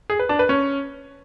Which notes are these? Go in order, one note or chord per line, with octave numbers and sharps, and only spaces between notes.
G#4
B4
D4
B4
C#4